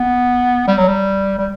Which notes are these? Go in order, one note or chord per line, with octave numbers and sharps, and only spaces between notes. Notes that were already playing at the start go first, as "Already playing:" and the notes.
Already playing: B3
G3
F#3
G3
G3